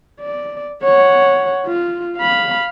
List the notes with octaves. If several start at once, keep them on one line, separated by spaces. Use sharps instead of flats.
D5
C#5 F#5
F4
F5 B5